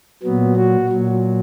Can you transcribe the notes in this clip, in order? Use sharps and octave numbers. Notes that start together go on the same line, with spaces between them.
A#2 F#3 B3
F#4
A#2 F#3